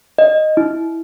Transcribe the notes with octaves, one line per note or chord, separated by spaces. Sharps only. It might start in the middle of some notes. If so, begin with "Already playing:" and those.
D#5
E4